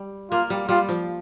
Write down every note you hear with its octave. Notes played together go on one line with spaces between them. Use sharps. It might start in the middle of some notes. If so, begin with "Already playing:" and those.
Already playing: G3
A#3 F4
G3
G3 F4
F3